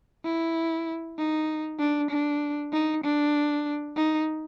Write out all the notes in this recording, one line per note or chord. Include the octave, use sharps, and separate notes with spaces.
E4
D#4
D4
D4
D#4
D4
D#4